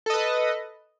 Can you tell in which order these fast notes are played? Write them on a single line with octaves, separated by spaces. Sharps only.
A4 D#5 B4